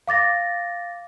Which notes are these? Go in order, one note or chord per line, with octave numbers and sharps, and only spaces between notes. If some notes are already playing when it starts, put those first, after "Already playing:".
F5 D6 A6 A#6